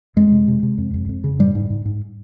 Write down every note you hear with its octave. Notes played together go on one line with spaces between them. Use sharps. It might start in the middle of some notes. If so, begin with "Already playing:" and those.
F2 G#3
C3
C3
C3
F2
F2
F2
C#3
G#2 G3
G#2
G#2
G#2